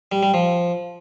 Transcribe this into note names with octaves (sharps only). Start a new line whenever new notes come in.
G3
G3
F3